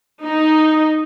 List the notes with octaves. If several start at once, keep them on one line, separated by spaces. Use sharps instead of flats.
D#4